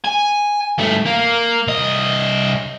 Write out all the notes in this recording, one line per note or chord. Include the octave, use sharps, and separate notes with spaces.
G#5
G2 A3
A#3
C2 D#5